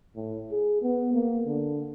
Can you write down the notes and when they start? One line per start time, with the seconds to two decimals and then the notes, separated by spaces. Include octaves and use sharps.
0.16 A2
0.51 G#4
0.82 B3
1.13 A#3
1.46 D3